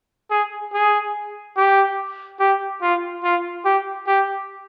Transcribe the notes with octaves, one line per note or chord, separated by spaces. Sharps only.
G#4
G#4
G4
G4
F4
F4
G4
G4